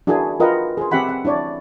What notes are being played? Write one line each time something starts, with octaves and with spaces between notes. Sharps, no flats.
D4 E4 F#4 G#4 A#4 G#5
F4 A#4 B4 D#5 F#5 G5
G#4 C5
C4 G4 E5 F#5 B5
F#5
D4 E4 C#5 D5